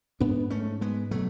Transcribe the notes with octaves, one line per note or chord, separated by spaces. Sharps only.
G#2 B3 D4
A3 C#4
G#3 B3
B2 F#3 A3